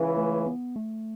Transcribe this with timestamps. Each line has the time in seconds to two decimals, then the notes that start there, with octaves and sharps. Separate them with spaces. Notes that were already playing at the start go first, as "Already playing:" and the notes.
Already playing: C#2 C#3 E3
0.17 A3
0.46 B3
0.76 A3